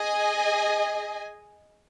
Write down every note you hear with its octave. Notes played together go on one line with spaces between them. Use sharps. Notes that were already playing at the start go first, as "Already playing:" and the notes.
Already playing: G#4 D#5 G#5